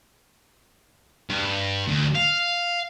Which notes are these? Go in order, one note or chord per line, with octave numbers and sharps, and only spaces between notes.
G2
D2
F5